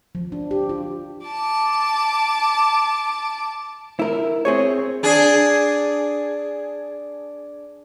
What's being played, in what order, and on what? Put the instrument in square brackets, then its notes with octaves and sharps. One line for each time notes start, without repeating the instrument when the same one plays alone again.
[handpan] F3
D4
G4
F4
[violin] A5 D6
[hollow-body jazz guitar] E4 A#4
C4 G#4 C#5
[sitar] D4 G#4